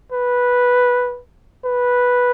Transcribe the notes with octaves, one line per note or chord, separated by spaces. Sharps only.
B4
B4